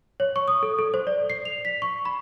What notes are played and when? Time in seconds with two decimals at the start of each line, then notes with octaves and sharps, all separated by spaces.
0.20 C#5
0.36 C#6
0.48 D#6
0.63 A4
0.79 A4
0.94 C5
1.07 D5
1.30 C7
1.45 F7
1.65 B6
1.82 C#6
2.05 B5